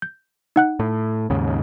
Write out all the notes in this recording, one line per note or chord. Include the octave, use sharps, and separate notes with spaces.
G6
D#4 F#5 F#6
A2
D#2 G#2 C#3